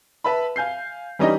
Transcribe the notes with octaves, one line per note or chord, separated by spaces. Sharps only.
B4 E5 A5 B5
F5 G#5 G6 C7
E3 G3 C#4 D#4 G4 D#5